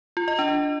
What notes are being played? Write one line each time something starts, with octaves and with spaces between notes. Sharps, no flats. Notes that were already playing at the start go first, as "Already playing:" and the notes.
F4
D#5
D4